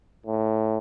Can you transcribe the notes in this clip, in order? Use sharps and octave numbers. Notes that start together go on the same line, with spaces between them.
A2